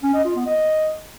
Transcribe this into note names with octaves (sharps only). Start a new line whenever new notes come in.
C#4
D#5
F4
B3
D#5